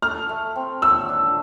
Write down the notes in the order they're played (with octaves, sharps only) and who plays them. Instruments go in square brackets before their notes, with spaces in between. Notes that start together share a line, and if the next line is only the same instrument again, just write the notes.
[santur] A4 [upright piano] F6
[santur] A3
C4
[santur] C#5 [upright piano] E6
[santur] D4